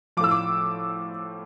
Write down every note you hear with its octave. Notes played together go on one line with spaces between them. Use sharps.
A2 F3 D6 E6
D6